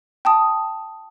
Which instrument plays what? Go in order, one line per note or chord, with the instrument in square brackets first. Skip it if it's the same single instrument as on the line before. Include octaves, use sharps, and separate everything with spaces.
[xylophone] G5 A5 D#6